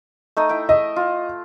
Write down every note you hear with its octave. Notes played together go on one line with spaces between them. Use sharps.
A3 D#4 D#5
E4 G5
D#5 E5
F4